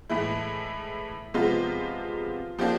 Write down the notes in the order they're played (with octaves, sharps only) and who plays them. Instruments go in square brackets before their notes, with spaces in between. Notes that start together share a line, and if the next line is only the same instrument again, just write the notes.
[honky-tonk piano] A2 E3 G#3 E4
C3 F3 G#3 B3 F4
F3 A#3 D4 G4